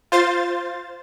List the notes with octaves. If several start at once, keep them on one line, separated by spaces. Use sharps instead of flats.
F4 C5 A6